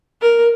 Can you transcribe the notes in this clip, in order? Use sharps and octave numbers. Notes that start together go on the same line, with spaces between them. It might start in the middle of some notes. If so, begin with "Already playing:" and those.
A#4